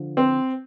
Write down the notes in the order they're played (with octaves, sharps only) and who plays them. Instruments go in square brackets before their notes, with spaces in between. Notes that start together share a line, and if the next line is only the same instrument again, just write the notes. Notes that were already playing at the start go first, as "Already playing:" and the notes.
Already playing: [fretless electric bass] D3 F3
[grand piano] C4